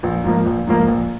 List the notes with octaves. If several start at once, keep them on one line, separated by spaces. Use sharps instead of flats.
A#1
G#2 F3 A#3
A#1
G#2 F3 A#3
A#1